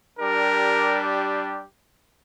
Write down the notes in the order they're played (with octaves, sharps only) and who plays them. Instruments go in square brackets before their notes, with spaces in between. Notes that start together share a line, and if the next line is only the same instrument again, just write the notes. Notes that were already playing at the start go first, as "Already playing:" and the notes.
[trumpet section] G3 D4 G4 A#4